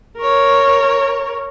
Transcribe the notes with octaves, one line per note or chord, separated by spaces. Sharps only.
A#4 C#5